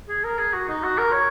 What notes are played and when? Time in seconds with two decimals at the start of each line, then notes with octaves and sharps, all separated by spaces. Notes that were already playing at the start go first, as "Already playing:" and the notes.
0.09 G#4
0.24 A#4
0.38 G#4
0.53 F#4
0.69 D#4
0.83 F#4
0.98 A#4
1.12 C#5